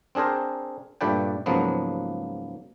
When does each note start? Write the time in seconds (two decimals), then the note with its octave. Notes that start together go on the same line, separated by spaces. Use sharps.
0.15 C4 D4 G#4 A#4 C5
1.01 G2 A#2 A3 B4 D5 G5
1.46 C#2 G#2 F3 F#3 A#3 B3